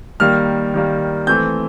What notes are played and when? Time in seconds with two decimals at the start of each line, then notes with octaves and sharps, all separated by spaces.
0.20 D#3 G3 A#3 F6
0.74 D#3 G3 A#3
1.27 E3 A3 C4 G6